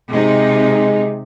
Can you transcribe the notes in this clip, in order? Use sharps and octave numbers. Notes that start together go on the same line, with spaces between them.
C3 G#3 D#4